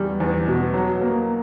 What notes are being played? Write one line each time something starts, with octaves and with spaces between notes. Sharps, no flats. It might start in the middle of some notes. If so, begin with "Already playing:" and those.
Already playing: E2 G3
E2
B2
F#3
A#3